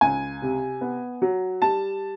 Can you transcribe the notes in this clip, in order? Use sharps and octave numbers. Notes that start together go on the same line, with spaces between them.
C#2 G#5
C3
B3
F#3
G3 A5